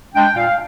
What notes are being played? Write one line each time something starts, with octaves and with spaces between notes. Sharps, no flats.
G#3 D4 G5
A#2 F5